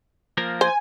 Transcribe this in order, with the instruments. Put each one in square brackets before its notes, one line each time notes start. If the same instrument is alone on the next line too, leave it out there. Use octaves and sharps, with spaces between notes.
[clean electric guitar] F3 A#3 A#4
[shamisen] C5 [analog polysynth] G#5